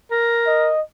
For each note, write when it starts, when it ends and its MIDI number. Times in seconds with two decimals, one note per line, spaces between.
0.11 0.71 70
0.46 0.81 75